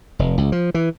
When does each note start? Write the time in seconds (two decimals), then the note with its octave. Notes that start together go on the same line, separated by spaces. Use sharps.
0.19 F1
0.38 C#2
0.52 F3
0.74 E3